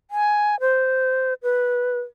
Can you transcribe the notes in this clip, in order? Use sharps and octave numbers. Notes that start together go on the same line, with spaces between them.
G#5
C5
B4